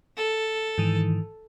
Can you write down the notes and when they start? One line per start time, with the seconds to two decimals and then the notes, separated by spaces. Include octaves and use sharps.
0.17 A4
0.78 G#2 D#3 E3